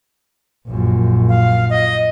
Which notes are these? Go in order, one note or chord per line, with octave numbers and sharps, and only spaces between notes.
A#1 F#2
F5
D#5